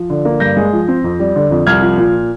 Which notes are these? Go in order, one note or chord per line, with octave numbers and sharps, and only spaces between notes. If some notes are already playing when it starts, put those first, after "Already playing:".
Already playing: F3
D3
A#3
G2 G6 A#6
G#3
F3
C4
F2
G3
D3
F2
C2 F6 G#6
F3
A#2